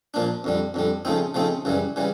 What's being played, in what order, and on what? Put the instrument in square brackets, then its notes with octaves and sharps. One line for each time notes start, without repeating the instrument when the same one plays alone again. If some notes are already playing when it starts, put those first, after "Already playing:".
[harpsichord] A#2 F3 A#3 D4
F2 D3 G3
F2 D3 G3
C#3 F3 A3 C4 D#4
C#3 F3 A3 C4 D#4
F#2 C#3 E3 G3
C#3 E3 G3